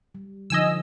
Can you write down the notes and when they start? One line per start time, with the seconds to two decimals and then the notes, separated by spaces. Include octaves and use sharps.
0.15 G3
0.50 D3 F3 D#4 D#5 G#5 E6